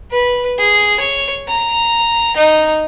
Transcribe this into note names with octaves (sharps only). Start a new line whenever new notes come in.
B4
G#4
C#5
A#5
D#4